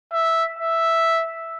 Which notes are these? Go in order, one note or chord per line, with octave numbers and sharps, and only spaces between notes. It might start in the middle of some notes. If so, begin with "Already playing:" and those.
E5
E5